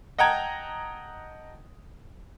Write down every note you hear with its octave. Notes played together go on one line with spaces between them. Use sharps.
D#5 F#5 G5 A5 A#5 G#6